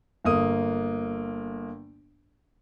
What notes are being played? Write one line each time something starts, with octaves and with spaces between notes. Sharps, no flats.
G1 A#3 D#6